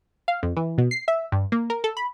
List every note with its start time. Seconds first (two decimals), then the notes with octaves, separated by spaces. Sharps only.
0.28 F5
0.43 F2
0.57 E3
0.78 B2
0.91 C7
1.08 E5
1.32 G2
1.52 A#3
1.70 A#4
1.84 A4
1.97 B5